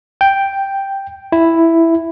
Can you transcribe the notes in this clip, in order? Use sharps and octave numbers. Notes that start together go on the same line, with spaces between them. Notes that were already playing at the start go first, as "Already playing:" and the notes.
G5
E4